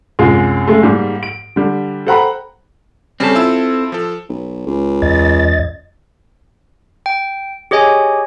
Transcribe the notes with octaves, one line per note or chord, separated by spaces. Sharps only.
C2 F#2 G#3 F4
C#3 G#3 A3
G#2 G3 A#3
D7
D3 G3
A4 C5 F#5 G5 A#5 B5
C#3 G3 C4 C#4 A4
E4 F4 E6
F3 A4
B1
C#2
E2 D#5 A6
G5
G4 G#4 C#5 D#5 G#5